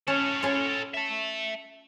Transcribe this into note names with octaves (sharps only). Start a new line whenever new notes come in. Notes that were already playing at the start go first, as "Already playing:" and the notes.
C#4 A4 C#5 F#5
C#4 F4
E5 A5